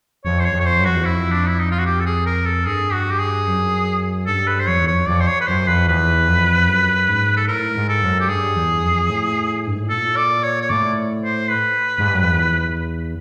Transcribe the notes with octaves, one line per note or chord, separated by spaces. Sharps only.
F2 C#5
C5
C#5
F2
C#5
C5
F#2
F2 F#4
E2
F2 E4
D4
E4
D#4
F4
F#4
G4
A4
G#4
A#4
A4
G2 G#4
F#4
G4
G#4
F#2
G2 A4
B4
C5
F2 C#5
E2
F2 C#5
F2 D5
C5
C#5
B4
F#2 C5
F2 B4
E2 B4
F2
F#2
G#2
A4
A2 A#4
G#2
A4
F#2
G4
G2 G#4
E2
F2
A2
G2
G#2
A2
A#2 A4
D5
C#5
C#5
A2 D5
C5
B4
G#2
G2
F#2
F2
E2